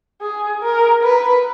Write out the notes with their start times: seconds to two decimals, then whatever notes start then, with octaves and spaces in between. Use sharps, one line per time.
0.21 G#4
0.62 A#4
1.04 B4